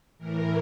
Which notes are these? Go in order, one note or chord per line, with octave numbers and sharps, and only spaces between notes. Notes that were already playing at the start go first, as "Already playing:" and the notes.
A2 E3 A#4